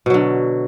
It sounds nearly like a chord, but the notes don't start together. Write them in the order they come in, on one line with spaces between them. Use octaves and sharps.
B2 F#3 D3